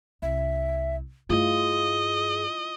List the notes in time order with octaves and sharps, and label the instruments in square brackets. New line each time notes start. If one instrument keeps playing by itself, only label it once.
[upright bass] C2 [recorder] E5
[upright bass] G2 A3 [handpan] E4 F4 [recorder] G#4 [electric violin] D#5